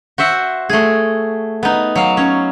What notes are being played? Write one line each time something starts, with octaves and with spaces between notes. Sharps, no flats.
F#4 C5 E5 F#5
A3 G#4
B3 D#4
F#3 F5
C#4